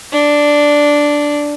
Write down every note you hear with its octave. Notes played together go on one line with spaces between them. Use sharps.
D4